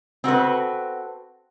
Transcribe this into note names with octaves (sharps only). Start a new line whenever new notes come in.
C4 F#4 A4 B4